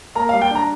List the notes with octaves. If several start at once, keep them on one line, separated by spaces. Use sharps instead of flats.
A#3 A#5
F5
G3
G5
D4 A#5